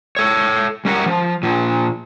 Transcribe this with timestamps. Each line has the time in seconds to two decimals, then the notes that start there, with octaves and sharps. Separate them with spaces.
0.17 A4 C#5
0.85 G3 C#4 A#4 F#5
1.06 F3
1.43 A#2 F3